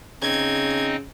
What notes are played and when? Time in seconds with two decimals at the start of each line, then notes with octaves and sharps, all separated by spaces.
0.22 C#3 C4 D#4 D#5 G#6